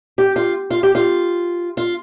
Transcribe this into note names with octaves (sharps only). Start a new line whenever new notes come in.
G4
F4
F4
G4
F4
F4